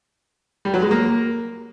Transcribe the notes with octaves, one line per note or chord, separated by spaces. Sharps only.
G3
F#3
G#3
A#3